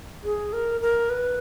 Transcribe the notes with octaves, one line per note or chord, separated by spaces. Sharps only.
G#4
A#4
A#4
B4